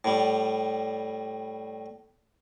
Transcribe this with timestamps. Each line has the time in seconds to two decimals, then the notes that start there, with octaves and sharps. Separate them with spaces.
0.05 A2 G3